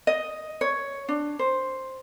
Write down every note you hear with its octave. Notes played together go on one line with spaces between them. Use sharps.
D#5
C#5
D4
C5